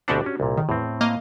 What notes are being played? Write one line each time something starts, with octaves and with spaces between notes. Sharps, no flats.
D2 B2 C4 D4 F#4 G4
C#4
C2 A#2
D#3
E2 A2 C4
A#3 D#5 F5